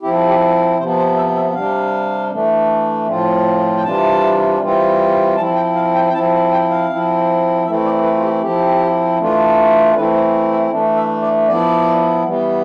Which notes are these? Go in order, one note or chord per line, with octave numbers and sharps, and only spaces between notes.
F3 C4 E4 G4
G4
C3 F3 B3 C5
C5
E5
E5
C3 G3 D4 F5
E3 A3 D4
A2 F3 C4 F4
G5
C3 E3 G3 D4 F4 A5
E3 G3 C4 F4
F3 C4 E4 A5
G5
F5
G5
G5
F3 C4 E4 A5
G5
F5
F3 C4 E4
E3 A3 C4 E4 E5
D5
B4
F4
G4
F3 C4 E4 G4
E3 A3 D4 F4
E3 A3 C4 E4 B4
C5
E5
E3 A3 D4
E5
D5
F3 B3 E4 D5
E3 G3 B3